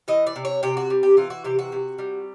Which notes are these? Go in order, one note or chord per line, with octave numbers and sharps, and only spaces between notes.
E3 D#5
D5
C3
C#5
C3 G4
F#4
G3
G4
E3 F4
F#4
C3 G4
F#4
C3
G3